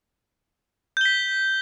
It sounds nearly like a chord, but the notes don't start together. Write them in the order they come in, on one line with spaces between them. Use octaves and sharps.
G6 G7 B6